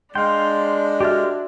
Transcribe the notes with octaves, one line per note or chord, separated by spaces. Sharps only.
G#3 D4 F5 G5 C6
F#4 G4 A4 E5 F6